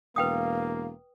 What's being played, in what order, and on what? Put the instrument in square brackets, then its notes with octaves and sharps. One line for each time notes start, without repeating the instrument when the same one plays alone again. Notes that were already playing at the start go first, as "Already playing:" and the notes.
[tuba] E1 [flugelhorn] A#3 [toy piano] B4 G5 D#6 [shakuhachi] F5